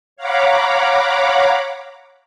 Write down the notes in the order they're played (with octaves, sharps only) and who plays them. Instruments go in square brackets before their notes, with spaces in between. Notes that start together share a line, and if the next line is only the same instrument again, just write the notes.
[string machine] C#5 F5 F#5 A#5 B5 D6